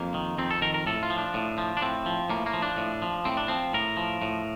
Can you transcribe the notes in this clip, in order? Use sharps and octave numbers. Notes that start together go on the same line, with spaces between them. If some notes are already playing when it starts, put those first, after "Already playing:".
Already playing: F2 A#3
D#3
F2 C4
A4
D#3 A#4
A#4
A2 A4
F4
F3
D4
A2
F3
D4
A2 C4
F3
A2 A#3
A#3
F3
D4
A2
F3
A2 C4
D4
F3 C4
A2 A#4
F3
A2